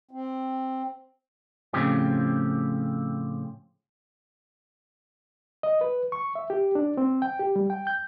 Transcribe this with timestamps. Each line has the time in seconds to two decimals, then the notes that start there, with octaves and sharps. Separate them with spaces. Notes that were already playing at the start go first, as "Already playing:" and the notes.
0.11 C4
1.73 A2 C#3 F3 C4 G4
5.63 D#5
5.81 B4
6.12 C#6
6.35 E5
6.50 G4
6.75 D4
6.97 C4
7.22 G5
7.40 G4
7.56 G3
7.70 G5
7.87 G6